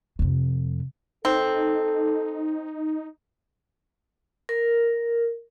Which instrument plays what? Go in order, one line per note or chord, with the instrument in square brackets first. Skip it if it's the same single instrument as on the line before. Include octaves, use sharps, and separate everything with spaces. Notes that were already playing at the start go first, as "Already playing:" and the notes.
[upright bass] F2 C3
[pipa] C4 [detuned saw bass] D#4 [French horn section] A4
[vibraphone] A#4